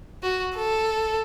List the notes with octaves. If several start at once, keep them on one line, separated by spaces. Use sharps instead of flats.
F#4
A4